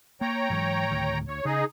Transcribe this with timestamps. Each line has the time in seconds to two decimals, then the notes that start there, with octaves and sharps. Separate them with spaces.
0.21 A#3 C#5 G5 A#5
0.50 G#2 E3 F#3
0.91 D2 A2 D#3
1.28 D2 C#5
1.45 C#3 D#4 G#4